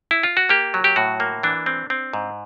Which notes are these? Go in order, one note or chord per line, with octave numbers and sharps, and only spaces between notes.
E4
F4
F#4
A#3 G4
F#3
G4
A2 F#4
A#3
E3 D4
C4
C4
G#2